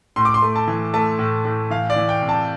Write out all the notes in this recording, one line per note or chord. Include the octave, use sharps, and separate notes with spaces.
A2 C6
D6
C6
A3
A5
E3
A3 A5
A2
A2
E3 F5
D5
E3
G5
C3
A5